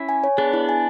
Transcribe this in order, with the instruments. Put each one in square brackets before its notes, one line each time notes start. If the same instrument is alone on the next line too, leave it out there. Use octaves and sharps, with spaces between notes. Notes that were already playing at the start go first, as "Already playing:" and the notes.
Already playing: [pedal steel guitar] C#4 E4
[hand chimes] G#5
C#5
[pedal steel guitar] B3 D4 [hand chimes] G#4
[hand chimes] E4
G#5